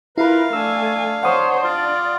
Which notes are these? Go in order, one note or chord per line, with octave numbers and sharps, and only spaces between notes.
E4 F4 A#4 B4 F5 B5
A3 D4 G#5 E6
C5 C#5 F#5 D#6
F4 D5